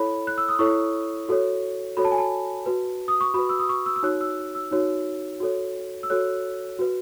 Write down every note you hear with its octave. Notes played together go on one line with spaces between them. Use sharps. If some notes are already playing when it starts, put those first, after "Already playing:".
Already playing: E4 A4 C#5 B5
F#6
E6
D#6
E4 A4 C#5 C#6
F#4 A4 C#5
F#4 A4 C#5 B5
A5
G#5
A5
F#4 B4
D#6
C#6
F#4 B4 B5
E6
D#6
C#6
E6
E6
D#4 F#4 C#5 F#6
E6
E6
D#4 F#4 C#5
F#4 A4 C#5
E6
F#4 A4 C#5 F#6
F#4 B4